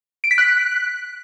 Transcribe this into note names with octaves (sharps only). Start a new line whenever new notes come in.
D7
B6
F#6